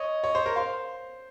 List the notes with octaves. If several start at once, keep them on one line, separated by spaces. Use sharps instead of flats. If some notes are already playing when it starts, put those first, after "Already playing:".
Already playing: C#5 D#5
C#5
C5
A#4
C5 F5